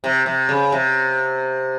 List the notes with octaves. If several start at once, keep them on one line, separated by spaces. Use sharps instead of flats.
C3
C3
C#3
C3